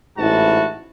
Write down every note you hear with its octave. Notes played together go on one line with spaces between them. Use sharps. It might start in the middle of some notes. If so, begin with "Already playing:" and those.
A1 G#2 E4 F#4 A5